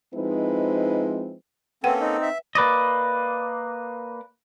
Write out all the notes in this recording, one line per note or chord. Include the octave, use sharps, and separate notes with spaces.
F3 G#3 C4 D#4 E4 B4
A#3 C4 C#4 A4 B4 F#5 G5
C4 D#4
E5
A#3 B4 D5 D#5